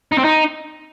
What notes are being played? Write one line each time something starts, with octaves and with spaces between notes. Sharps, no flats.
D#4
C4
D#4